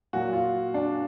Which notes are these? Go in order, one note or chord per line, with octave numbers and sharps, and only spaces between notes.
A#2 F#3 F#4
F4
D4